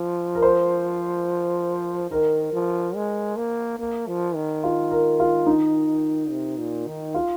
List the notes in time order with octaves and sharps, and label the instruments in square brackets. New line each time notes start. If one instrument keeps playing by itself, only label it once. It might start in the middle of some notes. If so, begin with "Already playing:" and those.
Already playing: [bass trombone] F3
[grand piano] A#4
C5
[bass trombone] D#3 [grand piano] A#4
[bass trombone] F3
G#3
A#3
A#3
F3
D#3
[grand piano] F4
A#4
F4
D#4
[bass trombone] C3
A#2
D#3
[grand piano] F4